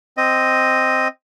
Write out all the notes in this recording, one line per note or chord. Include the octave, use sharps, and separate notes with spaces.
C4 D#5